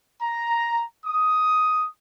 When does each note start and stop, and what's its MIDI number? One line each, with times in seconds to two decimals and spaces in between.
0.22 0.84 82
1.05 1.87 87